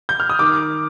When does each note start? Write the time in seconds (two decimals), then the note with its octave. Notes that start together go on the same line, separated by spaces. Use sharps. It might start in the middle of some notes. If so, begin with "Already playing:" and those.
0.09 G6
0.20 F6
0.30 D#6
0.39 D#3 D6